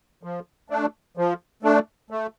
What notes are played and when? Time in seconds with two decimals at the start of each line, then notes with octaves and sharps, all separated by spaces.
0.23 F3
0.70 A3 D4
1.17 F3
1.63 A3 D4
2.11 A3